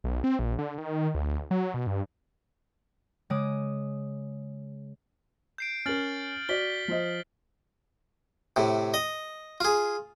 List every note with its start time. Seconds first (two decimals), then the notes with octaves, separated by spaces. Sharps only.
0.04 B1
0.24 C4
0.39 A#1
0.59 D3
0.78 D#3
1.15 D2
1.51 F#3
1.74 B2
1.87 G2
3.30 C#3 G#3 D6 D#6
5.58 G6 C7 D7
5.86 C#4 A#4 F6 A6 F#7
6.49 F#4 D5 B6 G7
6.88 F3 C5 D#5
8.56 A2 C3
8.94 D#5
9.60 F4 G#4